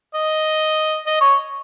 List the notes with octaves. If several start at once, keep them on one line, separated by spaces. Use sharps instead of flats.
D#5
D#5
C#5